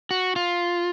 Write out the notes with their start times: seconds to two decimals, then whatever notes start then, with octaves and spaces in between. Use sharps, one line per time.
0.11 F#4
0.36 F4